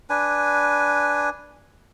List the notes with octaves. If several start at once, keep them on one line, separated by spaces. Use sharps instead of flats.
D4 B4 G#5